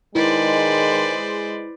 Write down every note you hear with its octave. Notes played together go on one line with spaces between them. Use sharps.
D#3 G#3 E4 B4 C5 D5